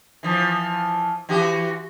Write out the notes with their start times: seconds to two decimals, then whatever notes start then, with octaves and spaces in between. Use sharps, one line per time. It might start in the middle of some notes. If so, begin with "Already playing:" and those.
0.23 E3 F3
1.29 E3 F#4 G4